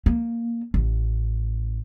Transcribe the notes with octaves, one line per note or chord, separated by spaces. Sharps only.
A#3
A1